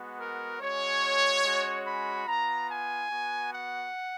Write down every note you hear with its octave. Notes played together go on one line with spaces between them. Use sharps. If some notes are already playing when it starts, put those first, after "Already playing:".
Already playing: G#3 B3 F#4
A#4
G#3 C#4 F#4 C#5
G#3 C#4 F#4
B5
B3 F4 A#5
G#5
B3 F#4
F#5